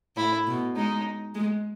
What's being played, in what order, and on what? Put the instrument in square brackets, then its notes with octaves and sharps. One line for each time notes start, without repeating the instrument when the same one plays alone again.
[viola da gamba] A2 [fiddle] E4
[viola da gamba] B2
[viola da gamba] G#3 [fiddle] D#4
[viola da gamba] G#3